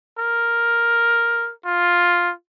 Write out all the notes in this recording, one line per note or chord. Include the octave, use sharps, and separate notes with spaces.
A#4
F4